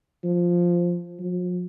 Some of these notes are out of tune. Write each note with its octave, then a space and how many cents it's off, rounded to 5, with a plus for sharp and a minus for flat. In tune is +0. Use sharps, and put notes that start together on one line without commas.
F3 +0
F3 +45